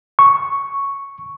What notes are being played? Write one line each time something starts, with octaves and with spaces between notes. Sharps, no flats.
C#6